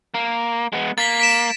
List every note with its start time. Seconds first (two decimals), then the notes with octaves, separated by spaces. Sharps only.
0.14 A#3
0.73 G#3 B3
0.98 A#3 A6 B6
1.20 B6 D7 E7